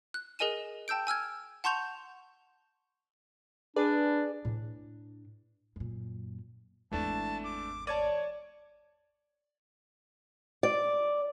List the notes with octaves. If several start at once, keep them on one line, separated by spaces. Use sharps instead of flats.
F#6
G#4 A#4 D#5 G#5 D#7 E7
G5 A5 E6 G6 D7
G#5 E6 F6 G#6
F#5 A5 C6 C#6 G6 F7
D4 G#4 B4 D5
A2 D4
F#2 A#2
G#1 E2 E3 A3 D4 A5
D6
C#5 D5 A5 G#6 D#7
D5